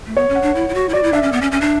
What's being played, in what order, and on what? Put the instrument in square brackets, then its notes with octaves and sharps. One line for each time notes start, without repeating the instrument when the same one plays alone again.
[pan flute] A3
[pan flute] B3 [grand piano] C#5
[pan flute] C#4
[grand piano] F#5
[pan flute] D4
E4
E4
F#4
E4
[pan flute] F#4 [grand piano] D5
[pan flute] E4
[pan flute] D4 [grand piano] E5
[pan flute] C#4
B3
C#4
C#4
D4